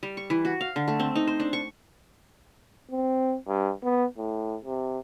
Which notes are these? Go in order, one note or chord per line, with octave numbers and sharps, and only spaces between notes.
G3
C#6
E3
F#4
F5
D3
A3
C4
D#4
C5
D4
C#6
C4
G2
B3
A2
C3